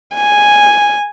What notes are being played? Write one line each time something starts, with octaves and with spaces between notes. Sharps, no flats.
G#5